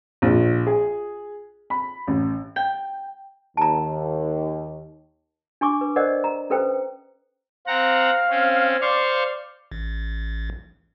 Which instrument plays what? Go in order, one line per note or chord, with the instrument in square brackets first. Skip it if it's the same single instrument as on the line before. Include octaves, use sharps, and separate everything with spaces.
[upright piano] A#1
G#4
B5
A1
[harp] G5
[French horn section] D#2 [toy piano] A5 A#5
[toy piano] D4 G#5 C#6 D6
B4
A#4 C5 D5 D#5 F#5
A#5
C#4 A4 B4 C5 G5
[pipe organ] C4 F#5 A#5 [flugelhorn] F5
[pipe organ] C4 C#4
[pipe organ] C5 F5 C#6 [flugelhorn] D5
[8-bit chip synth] A1